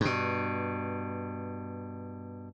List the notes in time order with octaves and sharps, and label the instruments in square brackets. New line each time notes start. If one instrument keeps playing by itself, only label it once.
[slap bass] G2 B2